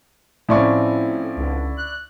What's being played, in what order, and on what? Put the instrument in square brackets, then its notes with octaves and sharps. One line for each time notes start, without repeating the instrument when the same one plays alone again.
[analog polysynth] A2 [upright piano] F3 C4 C#4 [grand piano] E4 D5 C#6
[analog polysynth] C#2 D3
F#6